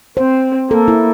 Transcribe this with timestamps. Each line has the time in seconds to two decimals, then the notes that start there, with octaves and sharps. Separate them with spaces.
0.17 C4 C5
0.70 A#3 A4
0.88 E4